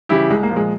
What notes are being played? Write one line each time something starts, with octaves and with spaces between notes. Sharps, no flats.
C#3 E3 G3 E4 G4
C2 G#3
A#3
A#2 F3
G#3